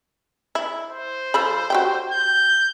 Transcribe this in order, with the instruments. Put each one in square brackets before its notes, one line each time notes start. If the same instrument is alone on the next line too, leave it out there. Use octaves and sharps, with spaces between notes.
[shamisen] E4
[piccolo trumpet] C5
[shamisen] F3 A4 B5
F#4 G4 G5
[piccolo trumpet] G6